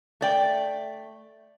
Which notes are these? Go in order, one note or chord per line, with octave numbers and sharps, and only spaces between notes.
A3 D5 G5